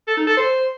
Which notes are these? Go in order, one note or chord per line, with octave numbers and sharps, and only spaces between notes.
A4
D#4
A4
C5